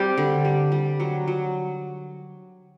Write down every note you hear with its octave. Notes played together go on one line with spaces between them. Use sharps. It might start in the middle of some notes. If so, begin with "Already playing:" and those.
Already playing: G3 C4 G4
D3
G3
G3
F#3
F#3